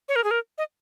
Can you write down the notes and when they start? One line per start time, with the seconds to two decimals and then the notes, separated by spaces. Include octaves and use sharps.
0.09 C#5
0.16 A#4
0.24 G#4
0.31 A#4
0.58 D#5